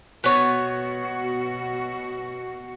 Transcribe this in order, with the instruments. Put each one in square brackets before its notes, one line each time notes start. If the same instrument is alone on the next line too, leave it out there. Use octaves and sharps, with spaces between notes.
[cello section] B2 F#4 [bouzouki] B3 C#5